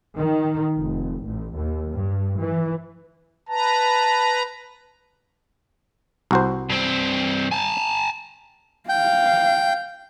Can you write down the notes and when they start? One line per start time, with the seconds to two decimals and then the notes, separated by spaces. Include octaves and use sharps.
0.17 D#3
0.79 F1
1.24 A1
1.56 D#2
1.92 G2
2.40 E3
3.49 B4 A5 A#5
6.31 C2 F#4 C5
6.70 G2 C4
7.51 G#5 A5
8.89 F5 G5